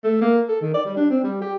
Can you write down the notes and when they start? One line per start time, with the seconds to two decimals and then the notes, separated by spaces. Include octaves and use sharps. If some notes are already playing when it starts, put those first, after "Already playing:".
0.04 A3
0.21 A#3
0.48 A4
0.61 D#3
0.74 D5
0.85 G3
0.97 D4
1.10 C4
1.24 G3
1.41 G4